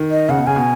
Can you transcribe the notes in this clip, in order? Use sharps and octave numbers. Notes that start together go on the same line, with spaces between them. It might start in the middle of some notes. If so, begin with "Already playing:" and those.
Already playing: D#3
D#5
C#3 F#5
B2
C#3 G#5
B2